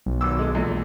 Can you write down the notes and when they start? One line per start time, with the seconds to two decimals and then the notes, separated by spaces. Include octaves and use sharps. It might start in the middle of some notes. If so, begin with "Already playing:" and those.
0.06 B1
0.21 G#1 D6 E6
0.39 D3 G#3
0.55 E2 A#2 G#3